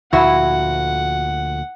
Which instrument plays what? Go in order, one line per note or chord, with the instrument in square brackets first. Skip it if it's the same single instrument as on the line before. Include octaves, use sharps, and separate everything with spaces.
[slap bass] D2 A#2 F3 [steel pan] E4 [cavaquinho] F#4 [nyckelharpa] F#5